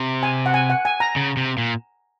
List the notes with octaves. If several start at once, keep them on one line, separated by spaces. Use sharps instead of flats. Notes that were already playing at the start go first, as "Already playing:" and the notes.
Already playing: C3
G#5
F#5
G#5
F#5
G#5
A#5
C#3
C3
A#2